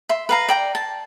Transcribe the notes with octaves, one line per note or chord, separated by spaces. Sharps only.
E5 C6
B4 F5 A#5
D5 G5 A#5
A5